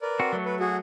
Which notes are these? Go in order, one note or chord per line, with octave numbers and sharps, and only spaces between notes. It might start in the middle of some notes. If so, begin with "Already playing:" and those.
A#4 B4 D5
C4 F#4
F#3 A3
B4
F#4 G#4